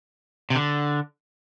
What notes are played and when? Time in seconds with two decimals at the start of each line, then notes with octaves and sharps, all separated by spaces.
0.50 C3
0.55 D3